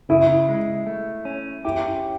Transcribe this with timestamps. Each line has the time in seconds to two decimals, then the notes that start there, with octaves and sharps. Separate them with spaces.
0.09 C#3 E4
0.49 G#3
0.86 A3
1.25 C#4
1.65 E4 G4